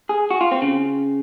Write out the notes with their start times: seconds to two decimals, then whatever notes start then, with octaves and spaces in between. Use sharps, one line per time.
0.09 G#4
0.31 F#4
0.41 F4
0.52 C4
0.62 C#3